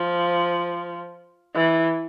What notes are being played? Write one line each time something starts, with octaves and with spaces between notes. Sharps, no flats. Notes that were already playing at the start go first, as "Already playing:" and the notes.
Already playing: F3
E3